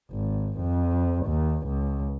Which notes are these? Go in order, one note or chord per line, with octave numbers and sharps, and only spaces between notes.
G#1
F2
D#2
C#2